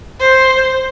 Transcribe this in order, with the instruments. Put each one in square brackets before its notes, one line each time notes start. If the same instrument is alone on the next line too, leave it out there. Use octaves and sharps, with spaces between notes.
[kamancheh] C5